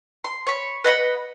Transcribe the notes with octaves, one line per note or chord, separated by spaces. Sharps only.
C6
C#5 B5
B4 D#5 F#5 B5